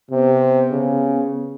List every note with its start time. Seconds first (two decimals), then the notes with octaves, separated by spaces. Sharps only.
0.11 C3 B3
0.70 C#3